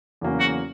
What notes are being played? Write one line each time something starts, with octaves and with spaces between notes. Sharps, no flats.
E2 C#3 F#3 A#3 C#4
F#4